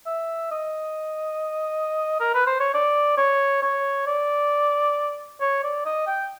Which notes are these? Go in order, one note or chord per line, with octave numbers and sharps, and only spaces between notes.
E5
D#5
A#4
B4
C5
C#5
D5
C#5
C#5
D5
C#5
D5
D#5
G5